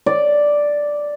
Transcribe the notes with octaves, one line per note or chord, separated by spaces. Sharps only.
D5